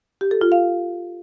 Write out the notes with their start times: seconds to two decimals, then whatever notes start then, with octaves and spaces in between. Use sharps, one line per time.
0.21 G4
0.31 A4
0.41 F4
0.52 F5